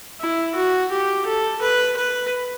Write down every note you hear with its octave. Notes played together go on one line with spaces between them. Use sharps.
E4
F#4
G4
A4
B4
B4